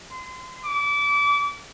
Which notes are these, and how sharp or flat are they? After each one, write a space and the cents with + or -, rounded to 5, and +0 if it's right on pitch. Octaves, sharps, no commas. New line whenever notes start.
C6 -30
D6 -30